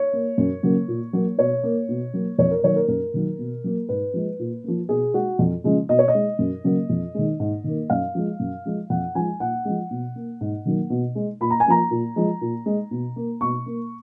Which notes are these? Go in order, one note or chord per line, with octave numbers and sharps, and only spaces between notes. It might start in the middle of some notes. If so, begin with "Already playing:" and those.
Already playing: C#5
A#3
F#2
C#3 F#3 A#3
A#2
F#3 A#3
B2 C#5
A#3
B2
F#3 A#3
F2 C#5
A#4
D#3 F#3 A#3 C#5
A#4
F#2 A#4
D#3 F#3
B2
F#3 A#3
G#2 B4
F3 G#3
A#2
F3 A#3
B2 G#4
G#3 F#4
F2
C#3 F3 G#3
B2 D#5
C#5
D#5
G#3
F#2
C#3 F#3 A#3
F2
D#3 G#3
G#2
D#3 A#3
F#2 F5
F3 G#3
F#2
F3 G#3
F2 F#5
F3 G#3 G#5
A#2 F#5
F3 G#3
B2
A#3
G#2
D#3 F#3 A#3
B2
G#3
A#2 B5
A#5
G#5
F3 A#3 A#5
A#2
F3 G#3
A#2
G#3
B2
A#3
B2 C#6
A#3